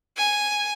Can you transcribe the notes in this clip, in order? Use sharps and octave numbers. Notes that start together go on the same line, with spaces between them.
G#5